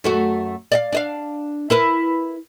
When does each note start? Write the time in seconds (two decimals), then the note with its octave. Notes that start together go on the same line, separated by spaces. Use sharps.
0.04 F#2 A3 F#4
0.72 D5 D#5 F5
0.93 D4 D#5 F5
1.70 E4 A#4 B4